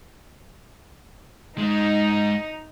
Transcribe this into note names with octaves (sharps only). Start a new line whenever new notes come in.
G#2 G#3 D#4